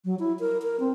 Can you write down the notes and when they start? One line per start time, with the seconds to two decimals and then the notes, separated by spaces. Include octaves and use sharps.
0.05 F#3
0.19 E4
0.40 A#4
0.62 A#4
0.80 C4